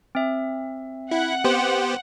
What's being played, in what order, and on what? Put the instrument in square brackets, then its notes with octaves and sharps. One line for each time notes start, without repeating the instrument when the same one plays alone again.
[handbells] C4 E5
[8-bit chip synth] E4 [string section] F#5
[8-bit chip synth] B3 G4 C5